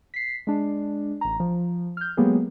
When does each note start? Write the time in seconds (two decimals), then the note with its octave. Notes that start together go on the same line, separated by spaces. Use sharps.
0.14 B6 C7
0.47 G#3 D4
1.21 A1 A#5
1.40 F3
1.97 F6 G6
2.17 F#3 G#3 A#3 B3 G4 G#4